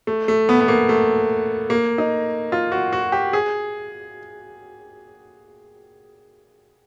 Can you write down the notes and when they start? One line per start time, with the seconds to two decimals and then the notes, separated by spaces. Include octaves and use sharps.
0.07 A3
0.28 A3
0.49 B3
0.61 B3
0.68 A#3
0.89 A3
1.70 A#3
1.98 D#4
2.52 F4
2.72 F#4
2.93 F#4
3.12 G4
3.33 G#4